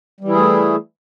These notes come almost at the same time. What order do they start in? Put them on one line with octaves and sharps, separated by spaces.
G3 E3 E4 G#4 A3